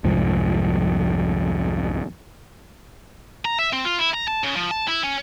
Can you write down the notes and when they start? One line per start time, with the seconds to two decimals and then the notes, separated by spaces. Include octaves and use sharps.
0.04 C2 F2 G#2 F3
3.45 A#5
3.59 E5
3.73 C4
3.85 F4
3.99 E4
4.14 A#5
4.28 A5
4.44 C#3
4.56 F3
4.71 A5
4.88 E4
5.03 C#4